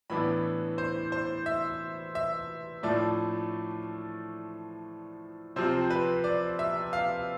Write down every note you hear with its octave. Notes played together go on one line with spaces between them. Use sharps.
A2 E3 B3 D4 B5
C5
C5
E5
E5
A2 F3 A3 D4 D5
C3 F3 C4 C5
B4
D5
E5
F5